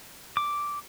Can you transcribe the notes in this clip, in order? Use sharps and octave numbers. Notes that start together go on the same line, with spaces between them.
D6